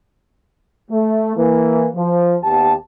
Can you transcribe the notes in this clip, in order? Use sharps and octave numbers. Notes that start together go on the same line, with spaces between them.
A3
E3 A#3
F3
D#2 B3 G4 A5